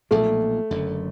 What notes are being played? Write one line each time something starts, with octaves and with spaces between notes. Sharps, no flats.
B1 A#2 F3 A3 A#3
F#1 F#2 D3